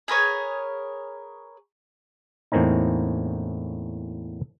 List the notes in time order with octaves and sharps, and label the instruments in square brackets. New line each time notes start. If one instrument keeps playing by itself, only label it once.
[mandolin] G#4 A#4 B4 C#5
[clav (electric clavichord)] E2 A2 A#3 C4 C#4 D#4